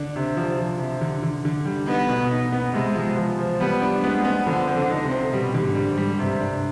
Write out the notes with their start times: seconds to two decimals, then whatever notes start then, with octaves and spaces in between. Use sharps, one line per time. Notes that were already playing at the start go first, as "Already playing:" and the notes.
Already playing: D3 D4
0.16 C3
0.37 F3
0.58 F3
0.79 C3
1.01 D3
1.23 D3
1.45 D3
1.66 G3
1.87 B3 D#4
2.09 B2
2.31 D#4
2.52 B3
2.74 C3 G#3
2.95 F3
3.16 F3
3.39 F3
3.60 G3 B3
3.82 D4
4.04 G#3 B3
4.25 B3
4.46 D3 F3
4.67 C4
4.75 D3
4.90 D#4
5.04 C3
5.11 C4
5.32 B2 G3
5.54 D3
5.62 G#2
5.75 G3
5.90 G#2
5.98 G3
6.19 G2 C3
6.40 D4